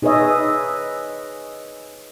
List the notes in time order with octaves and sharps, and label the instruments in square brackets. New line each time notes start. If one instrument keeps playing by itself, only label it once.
[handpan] D#4 G#4 B4 C#5 D#5 E5